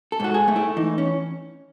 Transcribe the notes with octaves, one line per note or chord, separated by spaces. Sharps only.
A4
G#2 F#4
G#4
A3
E4
E3 D#4
C#4